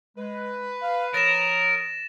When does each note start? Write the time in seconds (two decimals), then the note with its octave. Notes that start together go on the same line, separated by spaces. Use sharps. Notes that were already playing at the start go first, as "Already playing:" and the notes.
0.17 G#3 B4
0.82 F5
1.14 F3 A#4 C#5 D#6 A6 A#6 E7